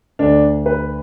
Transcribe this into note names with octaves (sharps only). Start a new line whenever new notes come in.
D2 D3 D4
B4